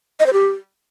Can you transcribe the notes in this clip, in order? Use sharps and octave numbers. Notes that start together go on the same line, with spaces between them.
D#5
C5
G4